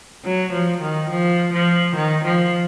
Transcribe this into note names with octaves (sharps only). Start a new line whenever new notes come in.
F#3
F3
D#3
F3
F3
D#3
F3